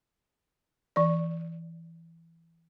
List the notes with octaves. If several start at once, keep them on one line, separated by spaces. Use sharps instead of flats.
E3 D5